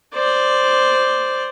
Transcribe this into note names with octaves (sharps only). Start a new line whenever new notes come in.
C5 D5